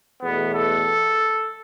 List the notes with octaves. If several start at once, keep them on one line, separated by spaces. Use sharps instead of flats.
E2 B2 A3 B3
A4